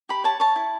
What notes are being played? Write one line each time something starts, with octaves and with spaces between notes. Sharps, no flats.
G4 B5
C#5 A5
C#5 A5
E4